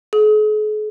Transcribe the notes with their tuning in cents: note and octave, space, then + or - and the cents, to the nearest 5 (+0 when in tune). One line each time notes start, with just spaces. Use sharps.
G#4 +45